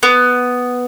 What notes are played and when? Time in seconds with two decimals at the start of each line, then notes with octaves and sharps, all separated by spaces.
0.03 B3